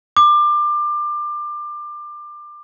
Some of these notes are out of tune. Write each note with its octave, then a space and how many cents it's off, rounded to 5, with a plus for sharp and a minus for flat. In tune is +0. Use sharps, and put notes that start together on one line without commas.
D6 +25